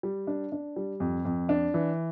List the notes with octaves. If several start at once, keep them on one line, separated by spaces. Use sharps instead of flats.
G3
D4
D4
G3
F2
F2
D4
E3